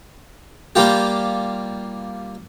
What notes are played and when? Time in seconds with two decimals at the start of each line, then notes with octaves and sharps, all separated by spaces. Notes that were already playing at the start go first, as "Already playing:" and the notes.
0.75 G3 A#3 F4 G4